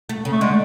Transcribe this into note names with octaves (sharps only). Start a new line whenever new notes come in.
A3
C#3
A3
D3 G#3